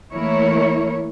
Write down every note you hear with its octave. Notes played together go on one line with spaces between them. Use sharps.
E3 A3 A#3 E4 A#4 C#5